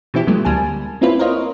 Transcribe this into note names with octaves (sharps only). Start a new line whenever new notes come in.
B2 E3 C4 E4 G4
C3 F#3 G#3 A#3
D2 G3 A#3 G#5 A5
A#3 C4 C#4 E4 F4 B4
A#4 C5 C#5 D#5 F5